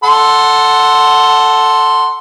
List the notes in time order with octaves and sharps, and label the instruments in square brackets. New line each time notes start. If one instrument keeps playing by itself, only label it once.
[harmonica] A4 F#5 C6